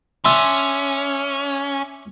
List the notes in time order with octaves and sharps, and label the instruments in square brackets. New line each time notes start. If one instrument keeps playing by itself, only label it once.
[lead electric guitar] C#4 [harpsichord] D4 E5 C6